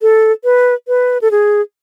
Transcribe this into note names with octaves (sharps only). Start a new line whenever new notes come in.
A4
B4
B4
A4
G#4